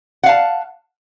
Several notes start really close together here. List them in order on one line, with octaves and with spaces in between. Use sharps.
F#5 F5 A5